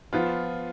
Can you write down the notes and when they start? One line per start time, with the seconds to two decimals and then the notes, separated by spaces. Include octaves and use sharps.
0.13 F3 B3 F4